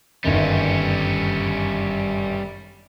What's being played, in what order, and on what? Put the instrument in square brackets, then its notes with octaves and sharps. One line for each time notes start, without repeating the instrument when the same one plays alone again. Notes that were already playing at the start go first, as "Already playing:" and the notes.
[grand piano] G1 F#2 D#3 [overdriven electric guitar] G3 C#4